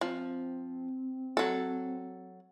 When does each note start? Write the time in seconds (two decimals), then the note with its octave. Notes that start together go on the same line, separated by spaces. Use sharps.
0.01 F3 C4
1.37 F#3 A4